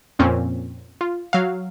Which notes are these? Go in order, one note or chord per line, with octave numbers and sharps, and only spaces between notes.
F2 A#2 C4 C#4
F4
F#3 F5